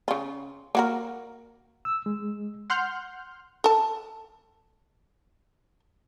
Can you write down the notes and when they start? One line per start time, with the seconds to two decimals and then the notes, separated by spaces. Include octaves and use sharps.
0.08 C#3 F4
0.75 A#3 F#4 A#4
1.85 E6
2.06 G#3
2.70 F#5 C6 F6 G6
3.64 A4 A5